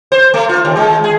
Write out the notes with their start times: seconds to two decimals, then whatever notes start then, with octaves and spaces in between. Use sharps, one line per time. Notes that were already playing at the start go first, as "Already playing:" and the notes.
0.12 C5
0.34 A3
0.49 F4
0.65 D#2
0.77 G#3
1.04 G#4